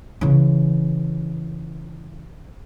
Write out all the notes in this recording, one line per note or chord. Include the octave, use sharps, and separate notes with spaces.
C#3 E3